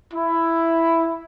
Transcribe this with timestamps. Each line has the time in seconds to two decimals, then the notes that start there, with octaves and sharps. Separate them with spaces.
0.13 E4